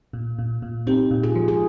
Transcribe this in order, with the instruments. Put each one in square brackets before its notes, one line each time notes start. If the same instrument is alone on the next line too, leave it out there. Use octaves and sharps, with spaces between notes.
[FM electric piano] A#2
A#2
A#2
[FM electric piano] C4 [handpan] D#4 G4
[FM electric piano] A#2
[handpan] F4 G#4
[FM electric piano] F3
[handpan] G#4